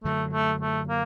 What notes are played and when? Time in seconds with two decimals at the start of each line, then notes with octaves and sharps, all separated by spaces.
0.04 F#2 D3 F#3 A3
0.33 A3
0.61 A3
0.89 A#3